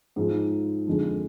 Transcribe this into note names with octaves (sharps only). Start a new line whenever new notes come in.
G#2 F3 G#3
F2 D3 G#3 D4